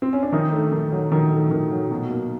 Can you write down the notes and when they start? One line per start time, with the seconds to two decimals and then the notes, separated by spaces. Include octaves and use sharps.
0.02 C4
0.13 C#4
0.23 D4
0.32 D#3 D#4
0.52 A3
0.72 D#3
0.92 F#3
1.12 D#3
1.31 A3
1.51 D#3
1.71 F#3
1.91 B2
2.10 A#3